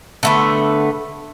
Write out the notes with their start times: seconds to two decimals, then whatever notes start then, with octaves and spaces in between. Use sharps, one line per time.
0.23 D3 A3 B3